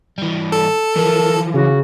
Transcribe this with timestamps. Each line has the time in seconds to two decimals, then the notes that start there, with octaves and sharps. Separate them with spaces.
0.18 E3 G3
0.52 A4
0.96 E3 F3 A#4
1.54 C#3 F#4